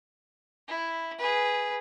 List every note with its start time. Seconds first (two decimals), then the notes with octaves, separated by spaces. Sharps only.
0.68 E4
1.19 G#4 B4